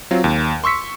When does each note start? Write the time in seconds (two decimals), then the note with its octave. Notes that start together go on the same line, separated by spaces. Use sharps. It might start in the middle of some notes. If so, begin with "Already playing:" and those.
0.11 F#3 C4 F4
0.24 D#2
0.64 C6 C#6 E6 B6 C#7